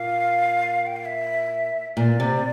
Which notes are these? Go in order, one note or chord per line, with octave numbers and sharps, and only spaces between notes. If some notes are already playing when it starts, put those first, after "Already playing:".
Already playing: A#2 F5
G5
F5
E5
A#2 D5
C3